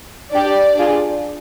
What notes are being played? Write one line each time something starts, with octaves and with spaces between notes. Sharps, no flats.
D4 G4 D5
D4 F4 G#4